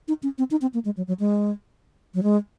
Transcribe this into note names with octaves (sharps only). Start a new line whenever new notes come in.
D#4
C#4
C4
D#4
C4
A#3
G#3
F#3
F#3
G#3
F#3
G#3